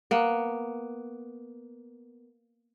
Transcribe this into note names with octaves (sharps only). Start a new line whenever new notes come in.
A#3 B3